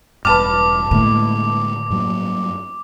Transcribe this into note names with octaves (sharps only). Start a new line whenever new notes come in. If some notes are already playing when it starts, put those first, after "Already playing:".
E1 G2 B4 A5 D6 F6
A2 D3 G#3 A#3
G2 F#3 A#3